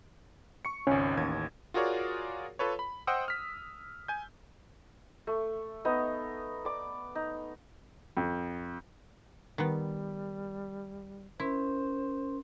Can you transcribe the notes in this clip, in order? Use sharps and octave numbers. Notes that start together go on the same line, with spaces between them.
C#6 C#7
G#1 C#2 C#4
A1 D#2 G#6
F4 F#4 G#4 A#4 C#5 D5
F4 A4 B4 C#5
B5
C5 D#5 F#5 G5 D#6 E6
F6 B6
G#5 G6
A3
B3 D#4 D#5
D5 D6
D#4
F2
D#3 G3 B3
C#4 E4 A#4 C5 C6